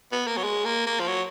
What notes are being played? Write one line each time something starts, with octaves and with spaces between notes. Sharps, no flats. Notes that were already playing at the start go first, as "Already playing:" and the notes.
B3
A#3
F#3
G#3
A#3
A#3
F3
F#3